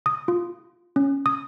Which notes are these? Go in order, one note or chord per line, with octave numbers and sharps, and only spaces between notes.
D#6
F4
C#4
D#6